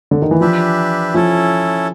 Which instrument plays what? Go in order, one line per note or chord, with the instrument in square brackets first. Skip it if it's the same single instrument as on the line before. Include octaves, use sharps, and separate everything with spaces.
[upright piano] D3
D#3
E3
[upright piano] F3 [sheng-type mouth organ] D4 G4 B4 E5
[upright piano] F3 [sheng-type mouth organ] C#4 E4 A4